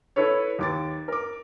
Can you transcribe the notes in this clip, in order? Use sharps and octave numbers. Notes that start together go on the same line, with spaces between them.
E4 A4 B4 C#5
D#2 D6 A6
A#4 D6